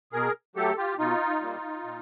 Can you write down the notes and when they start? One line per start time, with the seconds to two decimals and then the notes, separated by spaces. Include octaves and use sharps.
0.12 B2 G#4 A#4
0.56 F#3 A3 G4 A4
0.77 F4 G4
0.98 B2 D#4 F4
1.41 G3 A#3
1.84 A#2